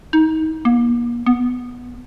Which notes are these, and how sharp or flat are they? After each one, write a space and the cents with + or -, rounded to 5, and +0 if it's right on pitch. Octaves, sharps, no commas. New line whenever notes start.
D#4 +25
A#3 +40
B3 -5